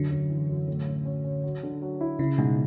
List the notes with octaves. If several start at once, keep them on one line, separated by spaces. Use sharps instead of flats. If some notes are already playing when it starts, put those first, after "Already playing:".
Already playing: F#2 D3
F#2
E3
F#2
A2
C#4
C#4
C#4
F#3
D3
F#3
E4
C#3 E4
G#2 B2